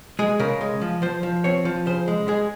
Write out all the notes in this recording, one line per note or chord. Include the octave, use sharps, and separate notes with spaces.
G#3 G#4
C#3 A#4
G#3
F3
F3 C5
F3
C4 C#5
F3
C#3 C5
G#3
G#3 G#4